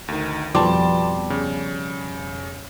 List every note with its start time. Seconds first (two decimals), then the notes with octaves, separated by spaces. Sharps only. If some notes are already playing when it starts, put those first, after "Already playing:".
0.08 D2 D#3
0.55 F2 B2 G3 A5 C6 D6
1.30 C#3